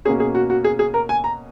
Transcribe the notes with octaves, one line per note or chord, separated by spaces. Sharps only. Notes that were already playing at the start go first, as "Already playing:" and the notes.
B2 A#3 C#4 G#4
G#4
F#4
F#4
G#4
G#4
A#4
G#5
A#5